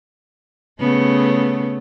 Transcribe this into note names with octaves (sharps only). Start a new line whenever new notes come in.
C#3 A3 B3